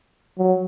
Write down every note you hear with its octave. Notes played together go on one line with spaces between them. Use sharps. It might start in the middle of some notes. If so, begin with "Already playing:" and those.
F#3